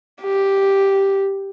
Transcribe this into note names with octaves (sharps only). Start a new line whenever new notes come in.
G4